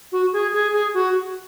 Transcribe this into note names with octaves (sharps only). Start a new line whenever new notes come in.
F#4
G#4
G#4
G#4
F#4